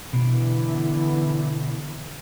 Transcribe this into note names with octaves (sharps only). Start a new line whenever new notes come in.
B2 D3 E3 B3